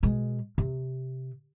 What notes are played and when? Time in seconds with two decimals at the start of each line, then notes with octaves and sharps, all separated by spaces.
0.03 B2 G#3
0.58 C3